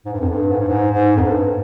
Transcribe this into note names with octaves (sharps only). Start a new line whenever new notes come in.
G#2
G2
F2
G2
G#2
G2
G#2
G#2
F2
G2